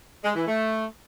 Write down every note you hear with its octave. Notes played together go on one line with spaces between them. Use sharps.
G#3
E3
A3